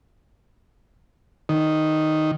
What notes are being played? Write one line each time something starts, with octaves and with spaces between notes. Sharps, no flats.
D#3